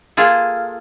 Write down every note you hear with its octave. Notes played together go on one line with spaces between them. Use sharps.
A#3 F4 G#4 A4